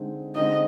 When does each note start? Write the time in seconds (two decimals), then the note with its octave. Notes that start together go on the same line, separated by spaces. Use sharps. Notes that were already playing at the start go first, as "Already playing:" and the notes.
Already playing: D3 G#3 C4 D#4
0.35 D3 G#3 C4 D#4 D#5